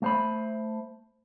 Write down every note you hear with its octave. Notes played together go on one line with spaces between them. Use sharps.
A3 C5 B5